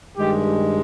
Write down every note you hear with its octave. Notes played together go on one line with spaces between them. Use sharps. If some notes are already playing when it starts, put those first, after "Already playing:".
G2 D#3 G#3 G4